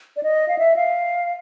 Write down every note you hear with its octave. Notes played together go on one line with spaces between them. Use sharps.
D5
D#5
F5
E5
F5